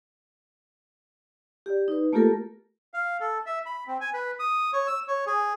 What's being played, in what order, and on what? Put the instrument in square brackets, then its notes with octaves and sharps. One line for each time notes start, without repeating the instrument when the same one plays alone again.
[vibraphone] G4 D5
D#4 B4
A3 A#3 F4 G4 A4 A#4
[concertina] F5
A4
E5
B5
C4
G#5
B4
D#6
C#5
E6
C#5
G#4